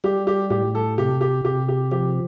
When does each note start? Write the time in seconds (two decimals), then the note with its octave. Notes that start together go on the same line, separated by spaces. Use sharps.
0.04 G3 G4
0.27 G4
0.50 A2 G4
0.75 A4
0.98 C3 G4
1.21 G4
1.45 C3 G4
1.68 G4
1.92 F3 G4